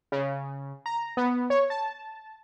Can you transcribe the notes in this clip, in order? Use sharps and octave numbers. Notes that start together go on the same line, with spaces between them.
C#3
A#5
B3
C#5
A5